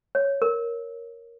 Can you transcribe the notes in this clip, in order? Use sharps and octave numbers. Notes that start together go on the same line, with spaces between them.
C#5
A#4